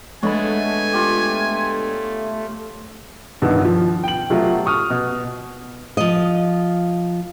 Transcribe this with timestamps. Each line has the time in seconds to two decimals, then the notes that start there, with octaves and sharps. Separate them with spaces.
0.23 G#3 A3 B3 D4 C#5 G#5 B5
0.94 F4 G4
3.42 B1 G2 B2 D#3 E3 F#4
3.65 F3
4.04 G5 F#7
4.30 B2 F#3 A3 F4 G4
4.66 C#6 D#6 F6
4.90 B2
5.97 F3 D#5